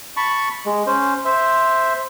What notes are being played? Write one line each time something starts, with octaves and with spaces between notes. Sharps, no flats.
A5 B5 C#6
G#3
C#4 C5
C5 E5